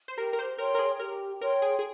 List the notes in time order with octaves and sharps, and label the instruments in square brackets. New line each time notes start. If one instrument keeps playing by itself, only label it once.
[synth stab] C5
[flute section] G4 [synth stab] A#4
[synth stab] A#4
C5
[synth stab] A#4 [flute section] C#5 G5 C6
[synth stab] A#4
G#4
[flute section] G4 [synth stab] A#4
[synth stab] A#4 [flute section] C#5 G5 C6
[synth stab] G#4
G#4